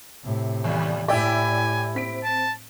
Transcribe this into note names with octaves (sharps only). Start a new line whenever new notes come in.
A2 C3
D#2 G3
A2 E4 G4 D5 G5 G#5 E6
C4 B6 D7
A5